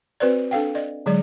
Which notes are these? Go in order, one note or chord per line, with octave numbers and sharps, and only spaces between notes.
C4 F#4 B4 C5 D5
D4 A4 F5 G5
D5 D#5
D3 F#3 G#3 G#4 D5